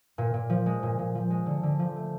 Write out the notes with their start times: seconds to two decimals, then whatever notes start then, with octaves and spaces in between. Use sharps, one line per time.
0.18 A#2
0.34 A#2
0.50 F3
0.66 G#3
0.83 A#2
0.99 A#2
1.15 F3
1.30 G#3
1.46 D3
1.63 D3
1.79 F3
1.96 A3